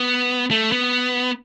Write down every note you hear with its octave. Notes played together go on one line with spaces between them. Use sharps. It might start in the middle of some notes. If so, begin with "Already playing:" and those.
Already playing: B3
A3
B3